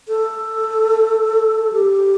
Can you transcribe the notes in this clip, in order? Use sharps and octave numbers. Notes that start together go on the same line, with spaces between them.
A4
G4